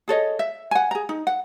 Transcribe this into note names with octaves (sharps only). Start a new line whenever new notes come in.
G#4 A4 C#5 D#5
E5
F#5 G#5
G#4 A#5
D#4
F#5